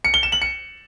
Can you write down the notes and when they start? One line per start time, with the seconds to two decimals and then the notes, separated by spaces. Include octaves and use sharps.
0.05 C#7
0.14 G7
0.23 E7
0.32 F#7
0.42 C#7